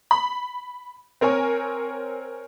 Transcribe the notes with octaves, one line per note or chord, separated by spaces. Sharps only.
B5
C4 A#4 C#5 G#5